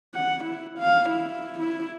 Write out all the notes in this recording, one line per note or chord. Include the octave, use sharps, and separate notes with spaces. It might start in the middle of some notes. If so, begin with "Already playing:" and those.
F#5
E4
F5
E4
E4